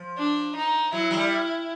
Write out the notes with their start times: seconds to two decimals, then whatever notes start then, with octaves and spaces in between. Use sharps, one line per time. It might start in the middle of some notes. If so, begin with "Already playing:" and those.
Already playing: F3
0.18 D4
0.55 D#4
0.92 F#3 E4
1.11 F#3
1.17 G3